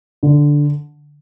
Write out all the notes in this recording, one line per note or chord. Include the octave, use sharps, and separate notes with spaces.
D3